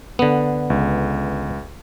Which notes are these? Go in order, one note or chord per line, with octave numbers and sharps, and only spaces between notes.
D3 B3
C#2